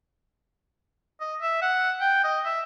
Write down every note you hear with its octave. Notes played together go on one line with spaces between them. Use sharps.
D#5
E5
F#5
G5
D#5
E5